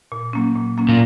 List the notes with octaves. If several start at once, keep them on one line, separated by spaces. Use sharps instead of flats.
A#2
F#3 A#3 C#4
A#2
F#3 A#3 C#4
A#2